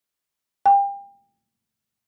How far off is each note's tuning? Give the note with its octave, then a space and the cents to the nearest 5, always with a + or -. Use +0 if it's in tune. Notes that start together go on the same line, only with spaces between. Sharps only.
G5 +35